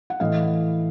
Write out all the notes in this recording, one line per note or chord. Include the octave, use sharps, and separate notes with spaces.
F#5
A2 E3 D#5 F5